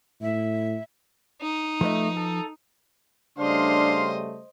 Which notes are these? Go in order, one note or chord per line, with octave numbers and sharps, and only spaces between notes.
A2 E5
D#4
F3 A3 B4 D#5
A4
C#3 G3 A3 D4 C5 D#5 F5 C6